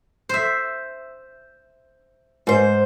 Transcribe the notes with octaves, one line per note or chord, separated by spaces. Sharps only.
C5 E5
G#2 C5